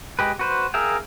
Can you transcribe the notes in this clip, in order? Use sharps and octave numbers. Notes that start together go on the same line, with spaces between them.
G#3 G4 B4
F#4 B4 C5
G#4 A#4 E5 F5 G5